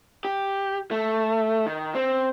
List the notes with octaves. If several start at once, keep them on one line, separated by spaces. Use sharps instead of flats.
G4
A3
D#3
C4